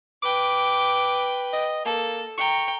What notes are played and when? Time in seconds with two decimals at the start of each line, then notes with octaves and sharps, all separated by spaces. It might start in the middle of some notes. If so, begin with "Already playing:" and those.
0.23 B4 G5 D6
1.53 D#5
1.86 A#3 A4
2.38 G5 A#5 C#6